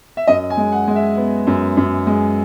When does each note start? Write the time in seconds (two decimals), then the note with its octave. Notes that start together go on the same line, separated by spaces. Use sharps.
0.17 E5
0.27 F#2 D#5
0.50 G#5
0.57 G#3
0.72 F#5
0.88 G#3
0.96 E5
1.17 B3
1.47 F#2
1.77 F#2
2.07 G#3